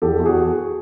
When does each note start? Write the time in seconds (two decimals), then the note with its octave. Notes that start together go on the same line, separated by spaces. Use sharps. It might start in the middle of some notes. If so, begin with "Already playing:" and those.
0.02 E2 G4 A4
0.20 E2
0.25 F#4 G#4